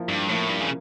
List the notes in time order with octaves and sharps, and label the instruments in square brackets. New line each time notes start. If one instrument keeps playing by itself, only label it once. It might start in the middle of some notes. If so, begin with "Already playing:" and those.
Already playing: [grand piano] F3 A#3 E4
[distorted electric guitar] G2
[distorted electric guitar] A2 [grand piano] F3 A#3 E4
[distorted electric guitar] G2
C#3